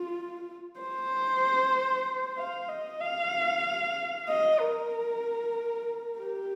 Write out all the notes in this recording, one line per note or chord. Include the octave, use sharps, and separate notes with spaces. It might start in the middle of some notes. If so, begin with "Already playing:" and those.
Already playing: F4
C5
F5
D#5
F5
D#5
A#4
G4